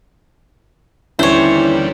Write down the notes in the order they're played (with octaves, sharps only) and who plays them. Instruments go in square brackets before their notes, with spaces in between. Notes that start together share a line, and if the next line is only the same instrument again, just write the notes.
[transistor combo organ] D#2 D3 G3 [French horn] E3 [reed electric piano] C#4 E4 [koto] C5 C#5